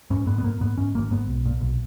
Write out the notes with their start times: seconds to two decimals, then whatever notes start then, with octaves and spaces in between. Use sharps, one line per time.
0.10 G#2 C#4
0.27 G#2 B3
0.38 B3
0.44 G#2 A#3
0.61 G#2 B3
0.78 G#2 C#4
0.95 G#1 A#3
1.11 G#2 B3
1.29 B1
1.46 A#2
1.61 B1